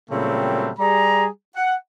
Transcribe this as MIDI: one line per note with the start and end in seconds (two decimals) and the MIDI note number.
0.10 0.71 46
0.10 0.71 49
0.10 0.71 54
0.10 0.71 55
0.10 0.71 57
0.10 0.71 60
0.79 1.26 55
0.79 1.26 68
0.79 1.26 82
1.56 1.75 78